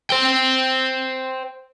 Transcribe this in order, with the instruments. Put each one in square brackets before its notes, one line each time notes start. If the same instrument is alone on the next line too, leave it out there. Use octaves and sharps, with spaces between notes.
[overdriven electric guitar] C5 G5